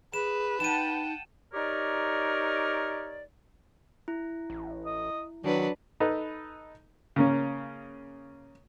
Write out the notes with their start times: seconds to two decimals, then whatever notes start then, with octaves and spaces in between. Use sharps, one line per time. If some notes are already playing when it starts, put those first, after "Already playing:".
0.14 G#4 B4 E7
0.60 D#4 F#5 G5 A5 D#7 E7
1.53 D#4 G4 A#4 C#5 D5
4.08 E4
4.50 A1
4.85 D#5
5.44 D#3 F#3 D4 B4
6.00 D#4 A4 B4
7.16 C#3 A#3 C#4